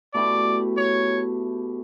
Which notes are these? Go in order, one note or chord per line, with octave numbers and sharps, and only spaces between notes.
B2 A3 E4 G4 D5
C#5